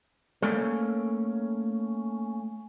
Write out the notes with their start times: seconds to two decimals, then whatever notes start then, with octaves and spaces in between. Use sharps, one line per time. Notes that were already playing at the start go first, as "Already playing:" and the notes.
0.42 A3 A#3 C#4 A4 A#4